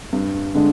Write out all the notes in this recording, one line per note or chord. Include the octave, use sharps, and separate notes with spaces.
G2
D3 G#3 D4